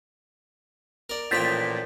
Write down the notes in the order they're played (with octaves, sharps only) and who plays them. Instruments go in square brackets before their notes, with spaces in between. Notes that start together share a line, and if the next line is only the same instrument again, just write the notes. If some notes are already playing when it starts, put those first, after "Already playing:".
[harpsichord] A#4 D5
[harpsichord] A1 F3 G5 [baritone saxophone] A#2 [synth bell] G6 A6 B6